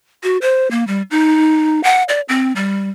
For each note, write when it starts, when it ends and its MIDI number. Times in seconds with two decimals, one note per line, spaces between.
0.23 0.38 66
0.42 0.70 72
0.71 0.86 58
0.87 1.02 55
1.11 1.83 63
1.83 2.03 78
2.09 2.21 74
2.29 2.53 60
2.56 2.90 55